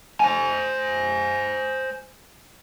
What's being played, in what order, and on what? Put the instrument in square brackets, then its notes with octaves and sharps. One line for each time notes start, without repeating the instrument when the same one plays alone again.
[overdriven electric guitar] C5 G#5